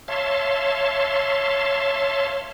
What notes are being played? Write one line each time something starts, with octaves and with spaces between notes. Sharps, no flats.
C#5 E5 F5 A5 C6